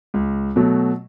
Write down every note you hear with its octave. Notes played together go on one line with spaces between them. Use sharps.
C#2
B2 F#3 A3